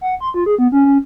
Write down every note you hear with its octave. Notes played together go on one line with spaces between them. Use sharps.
F#5
C6
F4
G#4
B3
C#4
C#4